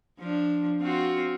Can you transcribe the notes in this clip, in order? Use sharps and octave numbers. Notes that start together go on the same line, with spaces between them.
F3 D4
C4 F4 F#4